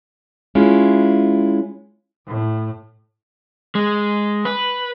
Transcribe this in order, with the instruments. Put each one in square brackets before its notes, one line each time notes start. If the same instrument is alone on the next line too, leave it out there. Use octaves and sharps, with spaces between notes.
[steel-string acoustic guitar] G#3 C#4 E4 F4
[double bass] A2
[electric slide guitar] G#3
B4